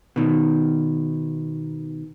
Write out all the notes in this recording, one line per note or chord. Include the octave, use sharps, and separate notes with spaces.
B2 D#3